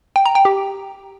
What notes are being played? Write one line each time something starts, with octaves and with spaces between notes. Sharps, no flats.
G5
A#5
G5
G4